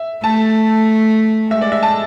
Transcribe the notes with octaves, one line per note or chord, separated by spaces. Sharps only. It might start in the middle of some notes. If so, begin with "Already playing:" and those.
Already playing: E5
A3 A5
G#3 E5
D5
E5
A5